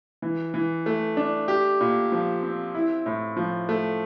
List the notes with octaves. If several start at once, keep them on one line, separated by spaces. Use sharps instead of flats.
E3
E3
A3
D4
G4
A#2
F3
C4
E4
A2
F3
A3